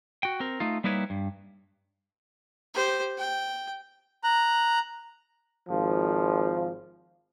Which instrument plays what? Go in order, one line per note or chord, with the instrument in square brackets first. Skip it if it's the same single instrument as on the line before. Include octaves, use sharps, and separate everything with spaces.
[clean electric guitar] F#4 G5
C4 A#4
A3 D#4 F4
G3 A#3 D#4 E4 B4 C#5
G2
[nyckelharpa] G4 C5
G5
[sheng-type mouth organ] A#5 F#6
[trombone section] G#1 F3